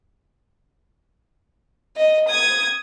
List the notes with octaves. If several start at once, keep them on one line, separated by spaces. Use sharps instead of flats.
D#5
D#6 G#6